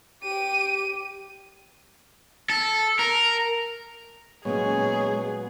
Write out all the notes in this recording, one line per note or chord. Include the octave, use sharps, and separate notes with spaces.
G4 D#7
A4
A#4
A#2 F#3 G#3 B3 C#4 G#4 C#5